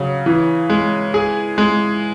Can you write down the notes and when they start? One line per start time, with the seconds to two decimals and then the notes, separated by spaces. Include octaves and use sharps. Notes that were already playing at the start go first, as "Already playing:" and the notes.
Already playing: C#3 F#3
0.26 E3
0.70 G#3
1.14 G#4
1.58 G#3